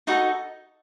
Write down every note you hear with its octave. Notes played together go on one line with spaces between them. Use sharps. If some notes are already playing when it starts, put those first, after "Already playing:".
D#4 F#4 A4 D#5